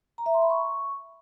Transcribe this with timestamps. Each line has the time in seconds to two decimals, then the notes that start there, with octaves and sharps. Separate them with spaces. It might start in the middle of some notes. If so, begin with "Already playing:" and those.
0.18 A#5
0.26 E5
0.34 C6
0.42 B5
0.50 C#6